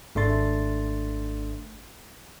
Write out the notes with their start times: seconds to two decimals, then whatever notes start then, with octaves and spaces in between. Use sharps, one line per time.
0.15 G#1 A3 D4 C6 A6